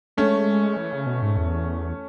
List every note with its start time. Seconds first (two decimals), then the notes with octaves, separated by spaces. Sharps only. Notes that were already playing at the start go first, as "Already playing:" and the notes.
0.17 G#3 A3 C#4
0.77 E3
0.93 C#3
1.07 B2
1.22 G#2
1.37 E2